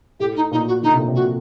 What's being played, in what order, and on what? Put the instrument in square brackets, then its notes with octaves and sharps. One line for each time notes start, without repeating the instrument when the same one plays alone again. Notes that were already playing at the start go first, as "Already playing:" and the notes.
[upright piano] A2 [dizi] G4
[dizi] D#4
[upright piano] A#2 [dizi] D#4
[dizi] F#4
[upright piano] D3 [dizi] D#4
[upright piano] C3
A#2
C3
[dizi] F#4